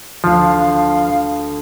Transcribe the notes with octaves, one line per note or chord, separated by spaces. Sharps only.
D2 D3 F3 F5